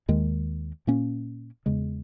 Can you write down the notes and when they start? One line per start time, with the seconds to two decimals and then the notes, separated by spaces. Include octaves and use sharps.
0.08 D#2 D#3 G#3
0.87 A#2 A#3 C#4
1.66 E2 C#3 G#3